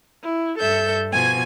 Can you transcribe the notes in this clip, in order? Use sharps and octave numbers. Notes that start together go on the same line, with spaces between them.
E4
G2 A4 E5 G6
B2 F3 G#5 G#6